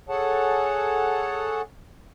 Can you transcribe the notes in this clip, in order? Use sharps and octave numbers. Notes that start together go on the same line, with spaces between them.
G#4 A4 C#5 F#5 A5